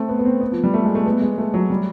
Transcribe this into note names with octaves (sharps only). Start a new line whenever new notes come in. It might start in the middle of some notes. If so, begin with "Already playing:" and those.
Already playing: A3 C4
B3
B3
C4
B3
F3
G3
A3
G#3
A3
B3
G#3
A3
F#3
G3